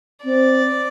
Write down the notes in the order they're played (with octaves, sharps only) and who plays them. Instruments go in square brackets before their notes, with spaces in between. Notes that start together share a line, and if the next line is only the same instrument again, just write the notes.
[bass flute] C4 [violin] D5